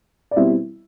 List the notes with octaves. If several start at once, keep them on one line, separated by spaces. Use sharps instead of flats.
D5
B2 G3 C4 E4 E5